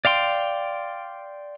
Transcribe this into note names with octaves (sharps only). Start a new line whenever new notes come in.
D5 F5 G5 C6